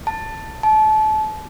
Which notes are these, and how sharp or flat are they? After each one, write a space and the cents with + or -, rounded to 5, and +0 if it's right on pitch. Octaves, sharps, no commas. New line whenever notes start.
A5 +10
A5 -30